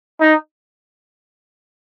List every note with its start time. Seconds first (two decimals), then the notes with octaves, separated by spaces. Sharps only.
0.20 D#4